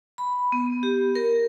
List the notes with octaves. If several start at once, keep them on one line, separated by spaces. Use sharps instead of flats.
B5
B3
G4
A#4